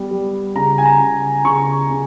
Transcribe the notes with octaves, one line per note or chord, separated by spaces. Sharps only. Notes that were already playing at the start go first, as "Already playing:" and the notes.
Already playing: G3 B3
G3
C#3 A#5
G#5
A#5
C#3
C#3 C#6
C#3